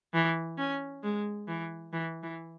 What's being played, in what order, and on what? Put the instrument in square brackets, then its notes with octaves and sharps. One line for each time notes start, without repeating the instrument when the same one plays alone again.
[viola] E3
C#4
G#3
E3
E3
E3